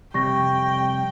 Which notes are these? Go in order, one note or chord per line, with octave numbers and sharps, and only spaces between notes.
F2 C3 G3 G5 C#6 A#6